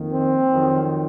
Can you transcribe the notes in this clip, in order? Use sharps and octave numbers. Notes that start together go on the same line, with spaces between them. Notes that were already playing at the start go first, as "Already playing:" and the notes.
Already playing: F2 D#3 A#3
C4
F2 D#3 F#3